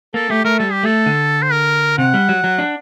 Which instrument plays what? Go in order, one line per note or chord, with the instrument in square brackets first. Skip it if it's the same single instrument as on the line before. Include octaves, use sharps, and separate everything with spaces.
[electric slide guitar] A#3 [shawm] A4
[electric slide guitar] A3 [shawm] G4
[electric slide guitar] A3 [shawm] A#4
[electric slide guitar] G3 [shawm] A4
[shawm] G4
[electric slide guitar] A3 [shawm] A4
[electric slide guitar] D3
[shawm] C5
A#4
[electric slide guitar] C3 [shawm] F#5
[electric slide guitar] G3
F#3
F#3
D4